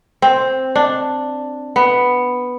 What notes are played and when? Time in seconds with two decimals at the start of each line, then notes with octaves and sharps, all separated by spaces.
0.22 C4
0.76 D4
1.76 B3